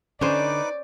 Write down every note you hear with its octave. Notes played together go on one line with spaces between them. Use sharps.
D3 C#4 D#4 B4 C5 D5 D6